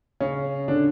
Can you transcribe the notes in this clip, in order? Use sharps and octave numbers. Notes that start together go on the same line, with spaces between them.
C#3 C#4
D3 D4